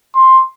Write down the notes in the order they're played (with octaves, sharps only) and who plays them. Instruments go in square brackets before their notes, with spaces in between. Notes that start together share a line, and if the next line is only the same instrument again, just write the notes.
[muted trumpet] C6